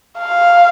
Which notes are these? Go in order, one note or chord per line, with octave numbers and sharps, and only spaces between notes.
F5